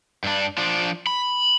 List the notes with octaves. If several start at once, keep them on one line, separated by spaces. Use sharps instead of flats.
G2 D4
F3 D4
B5